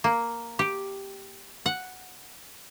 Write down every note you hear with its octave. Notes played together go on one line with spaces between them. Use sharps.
A#3
G4
F#5